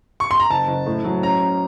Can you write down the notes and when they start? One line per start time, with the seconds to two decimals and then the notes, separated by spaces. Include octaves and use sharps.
0.20 C#6
0.31 C6
0.40 A#5
0.50 F#1 A5
0.68 F#1
0.86 A2
1.05 F#3
1.22 C#4 A#5
1.41 C#4